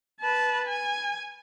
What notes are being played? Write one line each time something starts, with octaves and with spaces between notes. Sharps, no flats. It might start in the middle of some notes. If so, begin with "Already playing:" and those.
B4 A5
G#5